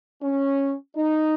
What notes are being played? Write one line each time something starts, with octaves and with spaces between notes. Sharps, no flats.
C#4
D#4